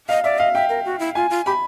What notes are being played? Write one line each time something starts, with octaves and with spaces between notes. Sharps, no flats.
D#5 F5
D5 E5
D#5 F5
E5 G5
A#4
F#4
E4
F4 G#5
F4
G4 B5